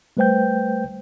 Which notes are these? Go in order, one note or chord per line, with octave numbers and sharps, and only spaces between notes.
G3 A3 B4 C5 G5 G6